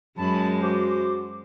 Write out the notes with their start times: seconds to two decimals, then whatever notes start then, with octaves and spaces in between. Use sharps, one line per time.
0.18 F#2 G#3 A5 B5
0.62 F#4 C5 D6